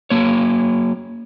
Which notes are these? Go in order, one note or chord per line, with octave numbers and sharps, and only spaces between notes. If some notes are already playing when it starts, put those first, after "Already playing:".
F#3 A#3 C#5